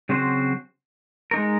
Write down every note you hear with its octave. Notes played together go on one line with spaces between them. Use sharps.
C#3 F#3 C4 F#4 C5
G#3 D#4 A#4